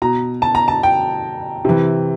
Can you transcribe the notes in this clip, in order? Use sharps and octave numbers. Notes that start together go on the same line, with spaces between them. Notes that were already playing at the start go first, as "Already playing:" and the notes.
B2 A#5
A5
A#5
A5
G5
C3 E3